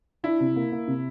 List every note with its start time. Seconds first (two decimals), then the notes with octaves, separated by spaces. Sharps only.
0.23 D4 E4
0.40 C3
0.56 A#3
0.72 A#3
0.88 C3